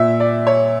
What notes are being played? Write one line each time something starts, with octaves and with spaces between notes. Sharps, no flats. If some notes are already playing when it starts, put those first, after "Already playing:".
Already playing: A#2 E5
D5
C#5